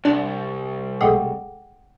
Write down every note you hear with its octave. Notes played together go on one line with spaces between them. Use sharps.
C2 D4
B1 B2 G#3 A3 F#5 G5 D6 D#6